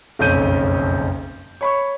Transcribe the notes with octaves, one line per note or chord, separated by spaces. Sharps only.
F#1 B1 F2 C#4 G6 D#7
C#5 B5 C#6